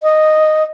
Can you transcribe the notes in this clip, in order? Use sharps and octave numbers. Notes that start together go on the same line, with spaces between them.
D#5